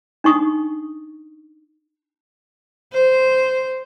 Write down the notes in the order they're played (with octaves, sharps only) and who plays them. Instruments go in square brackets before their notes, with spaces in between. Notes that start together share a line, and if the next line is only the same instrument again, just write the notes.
[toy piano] D4 D#4 C#6 D#6
[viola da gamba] C5